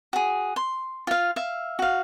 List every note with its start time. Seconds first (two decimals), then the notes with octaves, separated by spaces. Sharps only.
0.13 F#4 G#4
0.56 C6
1.07 F4 F5
1.36 E5 F5
1.79 F#4 F5